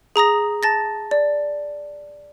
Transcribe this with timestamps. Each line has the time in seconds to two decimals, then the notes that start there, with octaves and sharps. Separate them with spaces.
0.16 G#4 A#5 D#6 A#6
0.63 A5 A6 A#6
1.11 D5